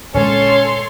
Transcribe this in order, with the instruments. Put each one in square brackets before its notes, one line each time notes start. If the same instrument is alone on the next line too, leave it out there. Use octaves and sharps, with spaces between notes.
[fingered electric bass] A#2 D3 G#3 [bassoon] C#4 [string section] A4 C#5 C6